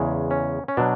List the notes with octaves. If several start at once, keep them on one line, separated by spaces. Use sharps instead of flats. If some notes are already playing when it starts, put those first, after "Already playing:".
Already playing: E2 C#3 G#3
C#4
C#4
B2 F#3 D4